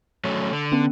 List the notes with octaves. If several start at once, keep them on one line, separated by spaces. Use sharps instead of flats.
F#3 A3 C#4
D3
B3 C#4